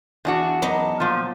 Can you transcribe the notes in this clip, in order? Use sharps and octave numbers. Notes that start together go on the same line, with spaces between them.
E2 D4 F#4
F#3 B3 D#4
A#2 F3